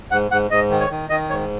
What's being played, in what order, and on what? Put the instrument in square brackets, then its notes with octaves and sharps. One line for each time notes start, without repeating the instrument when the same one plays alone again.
[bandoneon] G#2 F#5
G#2 F#5
G#2 D#5
D#3
C#5
D#3
D#3 D#5
G#2 C#5